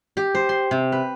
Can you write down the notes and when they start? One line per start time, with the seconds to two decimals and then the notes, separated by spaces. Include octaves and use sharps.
0.17 G4
0.35 C5
0.49 C6
0.71 C3
0.92 B4